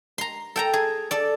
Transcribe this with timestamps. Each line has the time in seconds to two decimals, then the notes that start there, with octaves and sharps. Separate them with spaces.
0.18 A#5 C6
0.56 A4 G5 A#5
0.73 G#4
1.11 A4 D5